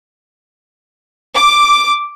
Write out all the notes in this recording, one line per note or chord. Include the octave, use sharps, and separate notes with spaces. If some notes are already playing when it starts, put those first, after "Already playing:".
D6